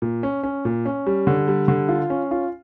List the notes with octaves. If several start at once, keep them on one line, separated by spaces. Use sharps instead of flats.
A#2
C#4
C#4
A#2
C#4
G3
D3
G3
D3
F4
C#4
F4